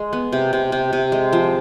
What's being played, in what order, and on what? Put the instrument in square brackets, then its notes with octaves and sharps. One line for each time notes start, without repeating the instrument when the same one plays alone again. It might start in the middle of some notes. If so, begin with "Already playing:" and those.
Already playing: [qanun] G#3
B3
C3
C3
C3
C3
G#3
F3